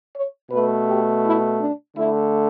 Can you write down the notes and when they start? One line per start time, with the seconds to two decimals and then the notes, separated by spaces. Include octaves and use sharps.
0.15 C#5
0.51 B2 A3 B4
0.87 G4
1.24 E4
1.60 D4
1.96 D3 A3 E4